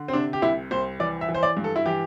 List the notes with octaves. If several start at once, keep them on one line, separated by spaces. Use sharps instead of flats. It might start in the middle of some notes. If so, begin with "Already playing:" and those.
Already playing: D3
C4
C3 D4
G4
C2 E4
C2 C5
E3 D5
E5
E3
C5
D5
G2
A4
E4
E3 G4